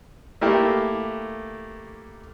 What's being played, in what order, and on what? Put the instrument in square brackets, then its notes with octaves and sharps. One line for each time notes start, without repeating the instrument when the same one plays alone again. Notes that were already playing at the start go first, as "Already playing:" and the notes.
[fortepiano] A3 A#3 E4 G4